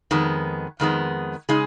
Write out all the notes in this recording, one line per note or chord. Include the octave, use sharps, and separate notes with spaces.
F2 D#3 G#3 B3
F2 D#3 G#3 B3
C#3 G#3 D#4 G#4